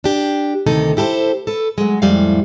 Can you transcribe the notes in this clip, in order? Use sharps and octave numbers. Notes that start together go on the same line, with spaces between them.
D4 G4
D2 C3 D#3 D#4 A4
E4 G4 A4 A#4 C5
A4 B4
F#3 G#3
F2 A2 G3 G#3 F5